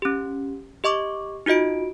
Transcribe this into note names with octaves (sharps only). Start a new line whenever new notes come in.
C#4 G4
G4 D#5 C#6 D6
D#4 F4 F#4 D#5 D7